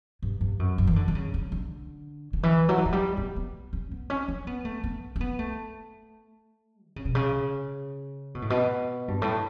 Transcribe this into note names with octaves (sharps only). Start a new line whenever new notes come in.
G2
G2
F#2
F#2
E3
D3
D3
C#3
D3
D3
D3
E3
F#3
E3
F#3
G3
B3
B3
C#4
B3
C#4
C#4
B3
A3
B3
C#4
B3
A3
D3
C#3
B2
C#3
B2
A2
B2
G2
A2